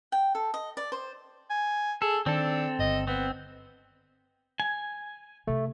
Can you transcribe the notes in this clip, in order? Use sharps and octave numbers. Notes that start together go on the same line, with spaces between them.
G5
A4
D#5
D5
C5
G#5
G#4 A4
D#3 C4 D4 A4
G1 D#5
B3 C4
G#5
C3 A3 E4